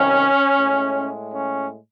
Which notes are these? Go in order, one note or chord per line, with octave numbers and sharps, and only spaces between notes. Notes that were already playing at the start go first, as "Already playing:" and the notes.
Already playing: C2 C3 D#3 C#4
A2 G#3
C#4